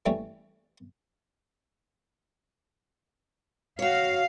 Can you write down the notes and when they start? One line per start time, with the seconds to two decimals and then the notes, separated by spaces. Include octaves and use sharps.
0.06 E3 G3 A3 C#4
3.79 F#4 C#5 F5